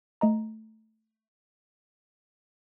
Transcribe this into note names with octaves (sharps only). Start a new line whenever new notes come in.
A3 D#5 A#5